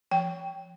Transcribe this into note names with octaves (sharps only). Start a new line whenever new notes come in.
F3 G5